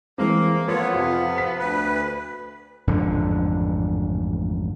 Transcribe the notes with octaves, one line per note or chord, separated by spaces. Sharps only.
E3 G#3 A#3 C4
F3 B3 F4 A4 C#5
F2 C3 F4
B6
D2 B4
A1 F2 G#2 D3